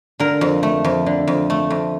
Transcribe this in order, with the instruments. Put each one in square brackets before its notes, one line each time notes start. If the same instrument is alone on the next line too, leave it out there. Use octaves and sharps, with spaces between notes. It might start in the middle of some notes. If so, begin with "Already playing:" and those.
[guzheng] D3 A#4
F2
A3
F2
D3
F2
A3
F2